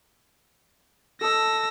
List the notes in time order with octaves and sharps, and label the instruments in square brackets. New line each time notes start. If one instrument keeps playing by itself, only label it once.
[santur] A4 D#5 [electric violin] E6 A#6